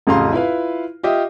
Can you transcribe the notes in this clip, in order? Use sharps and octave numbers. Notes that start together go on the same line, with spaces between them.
A1 F2 C#3 F5 A#5 C6
E4 F4 B4 F5
F4 G4 D#5 E5